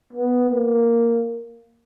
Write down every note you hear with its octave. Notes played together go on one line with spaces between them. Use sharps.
B3
A#3